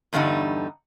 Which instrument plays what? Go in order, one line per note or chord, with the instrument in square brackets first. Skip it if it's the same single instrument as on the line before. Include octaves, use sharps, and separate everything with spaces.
[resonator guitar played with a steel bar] E2 G2 D3 G3 D#4